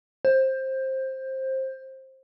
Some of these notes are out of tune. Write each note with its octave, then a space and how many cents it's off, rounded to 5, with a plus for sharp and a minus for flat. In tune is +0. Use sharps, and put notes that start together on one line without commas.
C5 +15